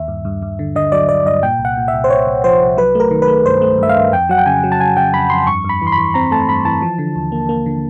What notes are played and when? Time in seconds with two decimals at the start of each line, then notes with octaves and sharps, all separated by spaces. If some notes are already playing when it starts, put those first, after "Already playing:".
Already playing: D#2 E5
0.08 G2
0.25 G2
0.42 G2
0.59 D3
0.76 D3 D#5
0.92 F#3 D5
1.09 G2 D5
1.26 G2 D#5
1.42 A#2 G5
1.59 C2
1.65 F#5
1.77 A#2
1.88 E5
1.94 C2
2.04 C5
2.10 C2 C#5
2.27 C2
2.44 F3 C5
2.61 C2
2.77 F#3 B4
2.95 A3 A#4
3.11 D#3
3.22 B4
3.28 A3
3.46 G2 C5
3.62 A3
3.78 G2 E5
3.89 F5
3.96 G2
4.12 F2 G5
4.29 F#3 F#5
4.38 G5
4.46 C#3 G#5
4.64 F#3
4.72 A5
4.80 C#3 G#5
4.97 C#3 G5
5.14 F2 B5
5.30 F2 C6
5.47 G2 C#6
5.65 G2 B5
5.82 E3
5.87 C6
5.92 B5
5.98 E3
6.14 C4 A#5
6.31 A3 A5
6.49 G2 B5
6.65 E3 A5
6.82 F3
6.98 D3
7.16 D#2
7.32 A#3
7.49 A#3
7.66 D3